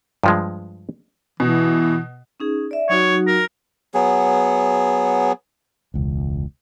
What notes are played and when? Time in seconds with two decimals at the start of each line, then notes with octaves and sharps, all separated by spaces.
0.24 G2 F3 G#3
1.40 B2 E3
2.40 C#4 D#4 G#4
2.71 D5 E5
2.89 F#3 D#4 F#4 C#5
3.27 A#4
3.94 F#3 B3 G#4
5.94 E1 C#2